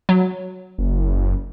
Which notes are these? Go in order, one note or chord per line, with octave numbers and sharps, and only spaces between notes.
F#3
F#1